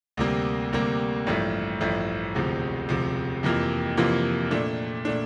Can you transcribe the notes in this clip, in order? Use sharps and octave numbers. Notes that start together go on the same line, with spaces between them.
D2 C3 G3 A#3
D2 C3 G3 A#3
A1 G2 F3 A3 E4
A1 G2 F3 A3 E4
E1 D2 C3 F3
E1 D2 C3 F3
F2 C3 E3 A#3 F4
F2 C3 E3 A#3 F4
A#2 A3 D4
A#2 A3 D4